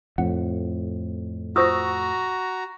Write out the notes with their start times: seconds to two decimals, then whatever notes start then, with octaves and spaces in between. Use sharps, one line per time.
0.18 F2 A2 F#5
1.56 F4 F#4 C5 A#5 C#6 D#6 E6 A#6